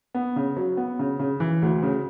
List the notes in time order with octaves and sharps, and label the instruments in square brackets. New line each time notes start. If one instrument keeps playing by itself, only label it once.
[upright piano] B3
C#3
F#3
B3
C#3
C#3
E3
D2
C#3